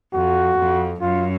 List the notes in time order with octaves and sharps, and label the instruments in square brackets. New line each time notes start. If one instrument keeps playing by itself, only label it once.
[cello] F2 [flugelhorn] F#4
[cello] F2
[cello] F#2 [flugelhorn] F4